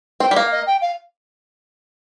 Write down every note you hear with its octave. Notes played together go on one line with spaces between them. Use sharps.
C4 G5
G3
A#3 F5
D#5
G5
F5